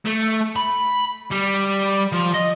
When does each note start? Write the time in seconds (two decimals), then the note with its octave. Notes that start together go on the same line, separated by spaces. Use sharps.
0.06 A3
0.56 B5
1.31 G3
2.13 F3
2.34 D#5